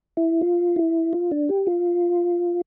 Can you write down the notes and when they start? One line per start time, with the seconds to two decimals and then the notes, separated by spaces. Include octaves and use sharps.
0.17 E4
0.41 F4
0.76 E4
1.13 F4
1.31 D4
1.49 G4
1.67 F4